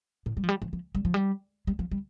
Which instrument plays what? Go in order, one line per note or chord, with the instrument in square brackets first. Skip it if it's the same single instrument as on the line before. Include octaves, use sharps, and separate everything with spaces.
[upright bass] A2
G3
F3
G3
F3
F3
G3
F3
G3
G3
F3
G3